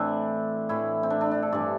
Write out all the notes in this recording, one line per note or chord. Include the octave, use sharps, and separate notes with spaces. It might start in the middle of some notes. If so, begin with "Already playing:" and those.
Already playing: A2 E3 C4 D4
A2 E3 E4
C4
D4
D4
D4
A4
G2 E3 D5